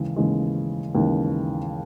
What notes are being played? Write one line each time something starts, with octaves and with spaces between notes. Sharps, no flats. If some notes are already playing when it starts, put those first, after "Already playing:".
Already playing: D#2 C#3 E3 G#3
D#2 C#3 E3 G#3
D#2 C#3 E3 G#3